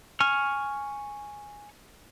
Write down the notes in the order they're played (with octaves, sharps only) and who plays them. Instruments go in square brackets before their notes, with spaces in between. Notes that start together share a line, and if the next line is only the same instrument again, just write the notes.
[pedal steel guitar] G#5 C#6 F6